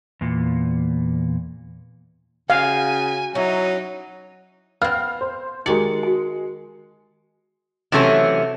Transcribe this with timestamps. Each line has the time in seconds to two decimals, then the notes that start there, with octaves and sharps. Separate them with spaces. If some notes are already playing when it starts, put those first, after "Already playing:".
0.21 E2 A#2
2.50 C#3 F#4 F5 G5 G#5
3.35 F#3 C#4 D#4 E4
4.82 B3 C4 F5 F6
5.21 C5
5.66 D#3 G#3 D#4 F#4 G4 D5 C#7
6.03 F#4 G#5
7.92 C3 E3 F#3 A3 C#4